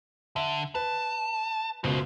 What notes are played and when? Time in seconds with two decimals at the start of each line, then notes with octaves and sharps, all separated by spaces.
0.36 D3 E5
0.75 B4 A5
1.84 F#1 C#2 B2 F#4 C5